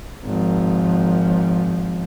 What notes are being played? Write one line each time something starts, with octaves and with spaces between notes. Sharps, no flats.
G#1 F3